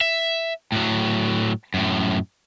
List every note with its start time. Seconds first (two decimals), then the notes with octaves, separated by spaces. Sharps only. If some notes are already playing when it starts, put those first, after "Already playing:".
0.01 E5
0.72 A2 F#3
1.74 F#2 A2